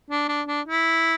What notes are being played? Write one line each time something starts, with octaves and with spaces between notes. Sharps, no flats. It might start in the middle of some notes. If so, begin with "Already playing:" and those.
D4
D4
D4
E4